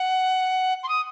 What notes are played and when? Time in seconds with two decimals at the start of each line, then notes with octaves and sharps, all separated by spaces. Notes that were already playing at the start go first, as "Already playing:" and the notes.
Already playing: F#5
0.83 C6
0.89 D#6